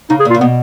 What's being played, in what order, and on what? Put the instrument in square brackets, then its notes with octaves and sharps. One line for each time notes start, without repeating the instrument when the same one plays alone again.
[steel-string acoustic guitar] C#3 [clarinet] D#4
[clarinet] G#4
[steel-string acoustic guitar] A#2
[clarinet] F4
[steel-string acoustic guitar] C#3
[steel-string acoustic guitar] B2 [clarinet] B3